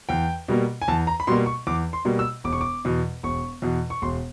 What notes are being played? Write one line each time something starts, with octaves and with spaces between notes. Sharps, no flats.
E2 G5
B2 G3 A#3
G#5
E2 A5
A#5
B5
B2 G3 A#3 C6
C#6
E2 D6
C6
B2 G3 A#3
E6
E1 D6
C#6
D6
E2 B2
E1 C#6
E2 B2
C#6
E1 C6